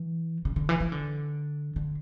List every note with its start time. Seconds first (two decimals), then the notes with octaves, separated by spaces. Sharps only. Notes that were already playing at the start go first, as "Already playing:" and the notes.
Already playing: E3
0.45 C#3
0.56 D3
0.69 E3
0.80 E3
0.92 D3
1.76 D3